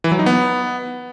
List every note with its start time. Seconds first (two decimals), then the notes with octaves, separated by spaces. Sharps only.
0.04 E3
0.12 F#3
0.19 D#4
0.26 B3